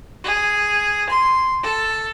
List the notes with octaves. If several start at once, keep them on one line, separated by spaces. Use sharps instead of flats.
G#4
C6
A4